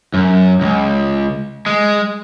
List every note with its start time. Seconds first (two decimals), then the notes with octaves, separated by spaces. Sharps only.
0.14 F#2
0.61 C#2
1.66 G#3